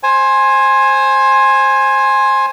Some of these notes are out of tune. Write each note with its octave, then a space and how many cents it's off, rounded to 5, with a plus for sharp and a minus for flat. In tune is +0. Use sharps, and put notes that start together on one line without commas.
C5 +20 G#5 +0